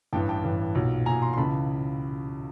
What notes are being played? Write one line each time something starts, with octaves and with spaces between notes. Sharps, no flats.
A1 G2 E3 G5 A5
G5 A5
A1 G2 E3
B1 A#2
B1 A#2 G#5 A#5
A#5 C6
C6
C#2 C#3 E3 A5 B5